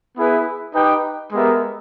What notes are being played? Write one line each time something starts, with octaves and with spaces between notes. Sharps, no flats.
B3 E4 G#4 B4
D#4 G4 B4 G5
G#3 B3 G4 A#4 E5